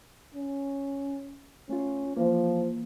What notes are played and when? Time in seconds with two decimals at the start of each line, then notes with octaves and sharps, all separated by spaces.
0.35 C#4
1.69 A3 C#4 F4
2.17 E3 F3 A#3